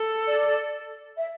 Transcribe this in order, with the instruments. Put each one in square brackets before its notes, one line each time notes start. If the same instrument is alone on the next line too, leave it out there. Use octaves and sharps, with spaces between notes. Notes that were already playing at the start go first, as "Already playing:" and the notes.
Already playing: [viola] A4
[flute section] D5
E5